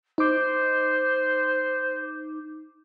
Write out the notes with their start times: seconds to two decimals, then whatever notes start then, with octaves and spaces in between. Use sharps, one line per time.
0.18 D#4 C5 D6